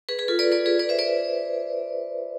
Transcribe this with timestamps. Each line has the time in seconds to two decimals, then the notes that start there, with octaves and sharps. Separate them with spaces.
0.09 G#4 B4
0.19 G#4 B4
0.28 F4 A4
0.39 B4 D5
0.52 B4 D5
0.66 G#4 B4
0.79 B4 D5
0.89 C5 E5
0.99 B4 D5